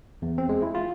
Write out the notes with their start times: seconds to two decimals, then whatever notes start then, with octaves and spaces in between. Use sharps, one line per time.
0.22 E2
0.38 C4
0.49 G#3
0.62 E4
0.75 F4